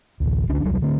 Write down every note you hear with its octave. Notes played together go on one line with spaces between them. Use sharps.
A1 D2
C#2 D3 C#4 D4
E1 C2 F#3 G3
D3 A3 C4